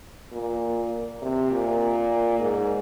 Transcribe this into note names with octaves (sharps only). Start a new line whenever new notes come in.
A#2
C3
A#2
G#2